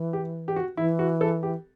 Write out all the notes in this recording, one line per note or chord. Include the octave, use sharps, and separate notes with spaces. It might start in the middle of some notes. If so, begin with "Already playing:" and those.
Already playing: E3
G4
G4
F#4
E3 E4
F#4
A4
G4